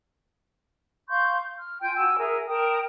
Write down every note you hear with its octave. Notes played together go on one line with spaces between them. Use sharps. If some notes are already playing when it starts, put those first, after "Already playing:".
F5 C6 C#6 G6
F6
F4 G5 G#5 G6
F#4 G#5 A5 E6
G#4 A#4 E5 G#5
A#4 G5 A5 D#6